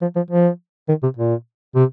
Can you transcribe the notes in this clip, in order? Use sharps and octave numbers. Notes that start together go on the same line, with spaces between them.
F3
F3
F3
D#3
C3
A#2
C3